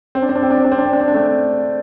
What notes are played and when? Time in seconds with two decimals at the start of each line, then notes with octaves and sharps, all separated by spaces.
0.15 C4
0.22 D4
0.29 C4
0.36 D4
0.43 C4
0.50 D4
0.58 C4
0.64 D4
0.72 C4
0.78 D4
0.86 C4
0.93 D4
1.00 C4
1.08 D4
1.14 A3 C4